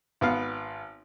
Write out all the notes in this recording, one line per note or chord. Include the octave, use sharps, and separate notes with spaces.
G#1 B3 F5